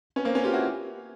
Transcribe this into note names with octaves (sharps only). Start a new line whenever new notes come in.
B3 C#4
A#3 C4
B3 C#4
F4 G4
E4 F#4